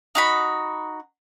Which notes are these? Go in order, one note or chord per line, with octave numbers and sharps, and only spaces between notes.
D#4 F#4 B5